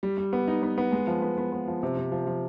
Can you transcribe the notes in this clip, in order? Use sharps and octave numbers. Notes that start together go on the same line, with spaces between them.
G3
G3
B3
D#4
B3
B3
G#3
F3
B3
B3
B3
F3
C3
C3
F3
F3